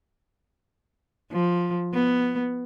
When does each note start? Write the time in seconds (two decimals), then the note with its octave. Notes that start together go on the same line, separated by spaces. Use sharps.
1.32 F3
1.94 B3